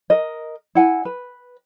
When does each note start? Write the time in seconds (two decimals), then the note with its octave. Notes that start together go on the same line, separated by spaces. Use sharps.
0.10 A#4 D#5
0.75 E4 F#5 G#5
1.05 B4